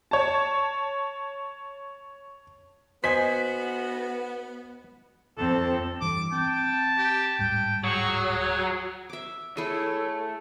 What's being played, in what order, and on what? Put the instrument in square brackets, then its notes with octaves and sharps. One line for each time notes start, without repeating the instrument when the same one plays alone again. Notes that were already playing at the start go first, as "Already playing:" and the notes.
[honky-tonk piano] C#5 A5
[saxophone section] B3 [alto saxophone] F#4 [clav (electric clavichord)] C5 D#5 G#5 [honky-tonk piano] B6
[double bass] F2 C4 [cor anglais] A4
[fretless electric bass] G2 E3 [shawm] D6
[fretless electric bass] C4 [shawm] G5 [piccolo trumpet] A5
[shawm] G4
[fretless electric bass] D1 G#2 G3 [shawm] G5
[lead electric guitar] F#3 [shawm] G#4 [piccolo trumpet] C#6
[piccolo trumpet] C#5
[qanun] E5 D6
[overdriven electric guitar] A3 [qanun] E4 G#4 [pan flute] A4 [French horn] C#5